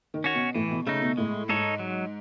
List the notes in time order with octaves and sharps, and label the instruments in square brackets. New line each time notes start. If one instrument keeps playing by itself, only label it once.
[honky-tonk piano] D#3
[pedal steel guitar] C#4 F#4 C#5
[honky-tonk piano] B2
[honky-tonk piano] A2 [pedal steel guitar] E3
[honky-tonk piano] B2
[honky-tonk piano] C#3 [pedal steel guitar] A3 D#4
[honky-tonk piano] B2
[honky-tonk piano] A2 [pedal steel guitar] G#3
[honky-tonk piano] G#2 [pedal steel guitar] D#4 A4 C#5
[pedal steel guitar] F#3